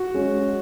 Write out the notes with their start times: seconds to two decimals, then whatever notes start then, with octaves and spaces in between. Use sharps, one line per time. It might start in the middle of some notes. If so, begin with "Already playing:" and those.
Already playing: F#4
0.14 G#3 C#4